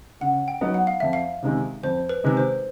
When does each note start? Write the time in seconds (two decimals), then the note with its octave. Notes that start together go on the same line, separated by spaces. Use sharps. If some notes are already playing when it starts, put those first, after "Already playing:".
0.21 C#3 F#5
0.48 G5
0.61 F#3 B3 D#4
0.74 F#5
0.87 F5
1.00 F2 E5
1.13 F5
1.42 C3 D#3 G#3 C4
1.83 F2 C5
2.09 B4
2.24 C3 D#3 G#3 C4 B4
2.37 C5